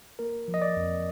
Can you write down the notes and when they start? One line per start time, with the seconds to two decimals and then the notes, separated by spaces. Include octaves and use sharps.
0.19 A#3 A#4
0.48 F3
0.54 D#5
0.62 D5
0.77 F2